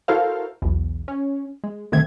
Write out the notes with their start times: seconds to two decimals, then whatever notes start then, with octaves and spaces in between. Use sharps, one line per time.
0.08 E4 F#4 A4 A#4 C5 F5
0.62 B1 E2
1.08 C#4
1.64 G#3
1.92 B1 D3 D#3 A3 C4 G#6